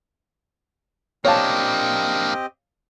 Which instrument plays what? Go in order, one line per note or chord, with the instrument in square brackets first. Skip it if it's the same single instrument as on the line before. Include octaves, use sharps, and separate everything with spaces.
[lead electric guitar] A#3 D4 [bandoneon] C4 G4 D#5 [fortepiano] C#5 F5 A5